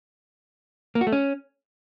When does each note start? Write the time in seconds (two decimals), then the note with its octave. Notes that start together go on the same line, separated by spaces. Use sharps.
0.95 A#3
1.01 F#4
1.07 A3
1.12 C#4